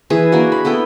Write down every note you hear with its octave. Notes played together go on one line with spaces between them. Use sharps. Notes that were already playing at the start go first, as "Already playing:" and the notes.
E3 G#4 B4
A#3 D4 F#4
B5
B3 E4 A4 G5